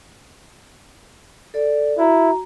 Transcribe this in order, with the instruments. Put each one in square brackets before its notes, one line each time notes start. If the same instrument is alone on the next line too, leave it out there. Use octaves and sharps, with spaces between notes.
[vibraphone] A4 D5
[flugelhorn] E4 [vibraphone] F#4 A#5